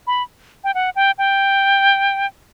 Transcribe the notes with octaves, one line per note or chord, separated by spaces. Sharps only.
B5
G5
F#5
G5
G5